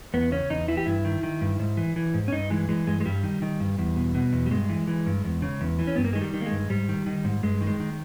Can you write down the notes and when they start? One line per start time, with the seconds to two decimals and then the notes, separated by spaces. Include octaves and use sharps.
0.14 E2 B3
0.32 C#3 C#4
0.50 E2 D#4
0.68 E3 E4
0.77 G4
0.86 G2 E4
1.05 D#3
1.23 D#3
1.41 G2
1.60 G#2
1.77 E3
1.96 E3
2.14 G#2
2.28 C#4
2.32 G2 D#4
2.50 E3 G#3
2.69 E3 G#3
2.87 G2 G#3
3.00 G#3
3.05 G2 G3
3.23 D#3
3.42 D#3
3.60 G2
3.78 E2
3.96 B2
4.15 B2
4.33 E2
4.46 G3
4.51 G2 G#3
4.69 E3
4.88 E3
5.06 G2
5.24 E2
5.42 C#3
5.61 E2
5.79 E3
5.87 C#4
5.96 G2 B3
6.05 A#3
6.13 D#3 G#3
6.21 G3
6.34 D#3
6.41 A#3
6.46 G#3
6.51 G2
6.69 G#2 G3
6.89 D#3
7.06 D#3
7.25 G#2
7.43 G2 G#3
7.61 D#3
7.67 G#3
7.80 D#3